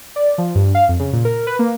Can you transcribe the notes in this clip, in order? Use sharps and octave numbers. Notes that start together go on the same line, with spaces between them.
D5
F3
G2
F5
F2
C#3
A#2
A#4
B4
A#3